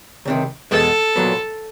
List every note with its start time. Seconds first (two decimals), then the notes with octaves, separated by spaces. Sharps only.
0.25 C#2 C3 D#3
0.71 E2 B2 G#3 B3 A4
1.16 B1 A#2 F#3 B3